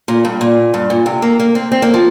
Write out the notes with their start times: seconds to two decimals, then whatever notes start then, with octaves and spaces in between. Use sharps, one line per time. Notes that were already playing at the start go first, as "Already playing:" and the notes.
0.08 A#2
0.25 G2
0.41 A#2
0.74 G2
0.90 A#2
1.06 C3
1.22 A#3
1.40 A#3
1.55 C4
1.72 C4
1.82 A#3
1.94 F3